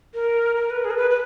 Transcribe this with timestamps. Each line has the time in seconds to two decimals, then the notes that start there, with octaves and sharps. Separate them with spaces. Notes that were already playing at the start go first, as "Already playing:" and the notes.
0.14 A#4
0.56 A#4
0.70 B4
0.84 G#4
0.91 A#4
0.97 B4
1.10 B4